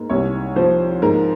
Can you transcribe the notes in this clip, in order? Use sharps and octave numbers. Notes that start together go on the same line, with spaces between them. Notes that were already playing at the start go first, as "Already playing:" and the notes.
Already playing: G#2 A#3
C2 C#5
F3 C5
G#2 A#4